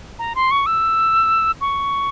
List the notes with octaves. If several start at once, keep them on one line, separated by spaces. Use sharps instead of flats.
A#5
C6
C#6
E6
C#6